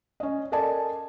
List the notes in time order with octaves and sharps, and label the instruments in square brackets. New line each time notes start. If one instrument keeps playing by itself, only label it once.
[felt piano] C#4 D#5
A4 A#4 D5 D#5 G#5 A5